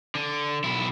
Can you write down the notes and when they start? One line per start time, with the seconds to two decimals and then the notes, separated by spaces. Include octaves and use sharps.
0.15 D3
0.64 B1 E4